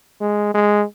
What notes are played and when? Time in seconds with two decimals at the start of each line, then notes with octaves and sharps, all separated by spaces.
0.21 G#3
0.54 G#3